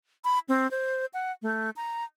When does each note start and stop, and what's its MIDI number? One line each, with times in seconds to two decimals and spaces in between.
0.24 0.39 83
0.49 0.69 60
0.71 1.06 72
1.14 1.32 78
1.42 1.70 57
1.76 2.04 82